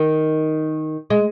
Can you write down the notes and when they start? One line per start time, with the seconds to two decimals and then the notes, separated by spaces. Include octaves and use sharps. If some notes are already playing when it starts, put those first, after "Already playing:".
Already playing: D#3
1.10 G#3